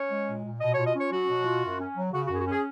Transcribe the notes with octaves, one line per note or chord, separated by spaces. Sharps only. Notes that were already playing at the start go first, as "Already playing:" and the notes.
Already playing: C#4 C#5
G#3
A#2
A#2
B2 D#5
C#5
F4
D#5
C#4
C#5
F#3 F#4
B2
F4
F#2
C#4
F#3
C#3 F#4
F#4
F#2 G#4
F#4
C#4 G#4